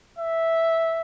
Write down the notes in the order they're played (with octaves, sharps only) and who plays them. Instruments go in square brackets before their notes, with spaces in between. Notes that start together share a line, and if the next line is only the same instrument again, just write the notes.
[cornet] E5